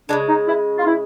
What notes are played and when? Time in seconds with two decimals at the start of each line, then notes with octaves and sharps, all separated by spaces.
0.08 C#3 E3 G#3 D4
0.27 D#4
0.47 E4
0.77 F4
0.85 E4